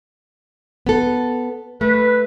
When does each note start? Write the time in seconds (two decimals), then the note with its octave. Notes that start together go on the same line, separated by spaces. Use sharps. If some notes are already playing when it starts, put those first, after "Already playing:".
0.87 B3 A4
1.81 A3 B4